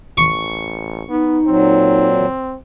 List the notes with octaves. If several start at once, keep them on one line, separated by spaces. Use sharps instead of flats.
A1 C#6
B3 D#4
A#2 F#3 C4